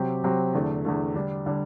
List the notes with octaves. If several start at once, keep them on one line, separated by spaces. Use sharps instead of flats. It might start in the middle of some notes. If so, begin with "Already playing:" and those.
Already playing: C3 F#3 C4 G4
C3 F#3 C4 G4
E2 D3 A3
E2 D3 A3
D3 G3 D4
D3 G3 D4